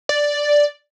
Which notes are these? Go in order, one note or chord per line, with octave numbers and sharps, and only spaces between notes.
D5